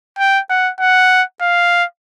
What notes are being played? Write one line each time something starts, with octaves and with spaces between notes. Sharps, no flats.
G5
F#5
F#5
F5